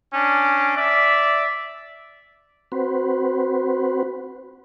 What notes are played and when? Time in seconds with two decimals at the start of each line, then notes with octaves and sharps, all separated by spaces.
0.13 C#4 D4
0.77 D5 E5
2.72 C4 F#4 B4 C5